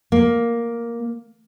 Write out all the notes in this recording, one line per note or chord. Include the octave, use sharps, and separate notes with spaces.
A#3